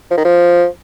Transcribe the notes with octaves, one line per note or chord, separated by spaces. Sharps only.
F3
D#3
F3